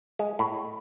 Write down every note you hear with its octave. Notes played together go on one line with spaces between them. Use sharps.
G#3
A2